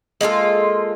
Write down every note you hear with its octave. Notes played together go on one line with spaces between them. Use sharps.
G#3 A#3 F4 A4